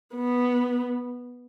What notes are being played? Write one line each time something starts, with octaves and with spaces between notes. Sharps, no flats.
B3